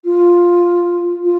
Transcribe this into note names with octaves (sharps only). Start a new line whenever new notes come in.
F4
F4